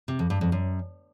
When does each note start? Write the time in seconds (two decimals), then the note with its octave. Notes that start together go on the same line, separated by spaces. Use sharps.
0.08 C3
0.19 F2
0.30 G2
0.41 F2
0.52 F#2